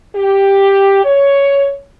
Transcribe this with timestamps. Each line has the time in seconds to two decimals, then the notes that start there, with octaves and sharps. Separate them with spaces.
0.15 G4
1.04 C#5